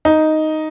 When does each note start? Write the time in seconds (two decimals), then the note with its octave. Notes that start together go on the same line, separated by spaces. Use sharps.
0.05 D#4